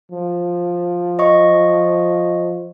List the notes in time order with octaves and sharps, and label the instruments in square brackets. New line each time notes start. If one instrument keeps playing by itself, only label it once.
[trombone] F3
[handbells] D#5 C#6